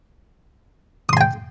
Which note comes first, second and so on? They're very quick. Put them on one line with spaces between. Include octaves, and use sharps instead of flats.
D#6 C6 G#5 G5